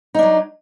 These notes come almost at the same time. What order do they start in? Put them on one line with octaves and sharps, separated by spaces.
D#4 D4 F#3